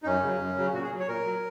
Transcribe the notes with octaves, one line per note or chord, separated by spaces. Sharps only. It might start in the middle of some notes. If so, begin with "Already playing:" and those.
D#4
F#2 C#4
C#3 F#3
F#2
C#3 F#3
A#2 F#4
G#4
F#3
C#5
A#2 A#4
F#3